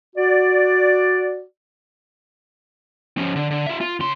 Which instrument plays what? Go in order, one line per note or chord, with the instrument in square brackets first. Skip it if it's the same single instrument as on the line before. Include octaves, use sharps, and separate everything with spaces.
[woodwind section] F#4 D5
[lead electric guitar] F3 C#4
D3
D3
F4 E5
F4
C#3 C6